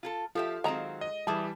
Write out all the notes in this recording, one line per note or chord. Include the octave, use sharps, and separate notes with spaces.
F4 G#4 A4
F3 F4 G4 A4 E5 F5
D#3 F#3 G#3 C4 A#5
D#5
E3 G3 G4 G#4 E5 A5